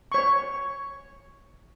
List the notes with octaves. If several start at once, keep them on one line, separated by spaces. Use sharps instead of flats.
C#5 C#6